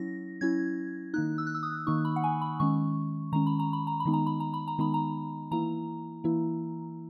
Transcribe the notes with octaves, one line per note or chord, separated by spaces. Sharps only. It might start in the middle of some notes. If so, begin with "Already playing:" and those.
Already playing: F#3 C#4 E4 A#6
F#3 C#4 E4 G#6
D#3 A#3 D#4 F#6
E6
F#6
E6
D#6
D#3 A#3 D#4 C#6
B5
F#5
G#5
B5
D#3 G#3 C#4 C#6
D#3 G#3 C#4 A#5
B5
A#5
B5
A#5
B5
D#3 G#3 B3 D#4
A#5
B5
A#5
B5
A#5
D#3 G#3 B3 D#4 B5
A#5
E3 A#3 E4 A#5
E3 A#3 E4